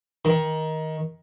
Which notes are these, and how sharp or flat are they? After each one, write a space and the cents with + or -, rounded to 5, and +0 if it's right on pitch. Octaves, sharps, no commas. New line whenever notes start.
D#3 +15